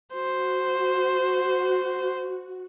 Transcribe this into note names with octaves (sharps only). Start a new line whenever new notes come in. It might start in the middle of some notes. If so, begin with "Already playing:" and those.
F#4 C5